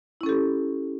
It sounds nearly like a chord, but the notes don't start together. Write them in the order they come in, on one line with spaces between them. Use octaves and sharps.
E4 C#4 A4 G4